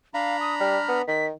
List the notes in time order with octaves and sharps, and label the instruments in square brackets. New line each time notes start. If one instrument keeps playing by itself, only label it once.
[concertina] D4 A#5 B5 [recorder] F5
[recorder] D#6
[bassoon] G3 [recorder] F6
[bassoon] B3
[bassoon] D#3 [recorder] B6